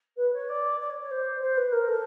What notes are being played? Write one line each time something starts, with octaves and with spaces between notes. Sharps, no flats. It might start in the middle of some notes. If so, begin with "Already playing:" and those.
B4
C#5
D5
D5
C#5
C#5
C5
C5
B4
A#4
A4